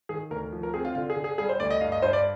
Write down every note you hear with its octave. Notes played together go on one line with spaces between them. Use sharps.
D#3 G#4
D2 A#4
F3
A#4
C4 G#4
F4
D3 F4
G#4
D3
G#4
G3 G#4
C5
D2 D5
D#5
G2 F5
D#5
G2 C5
D5